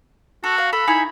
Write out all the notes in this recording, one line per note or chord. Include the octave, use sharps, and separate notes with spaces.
F#4 A4
F5
A4 B5
D#4 E4 G#5